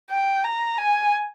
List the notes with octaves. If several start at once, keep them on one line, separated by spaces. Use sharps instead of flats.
G5
A#5
G#5